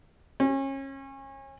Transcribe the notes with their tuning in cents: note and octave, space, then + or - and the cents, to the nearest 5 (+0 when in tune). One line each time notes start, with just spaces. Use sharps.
C#4 -30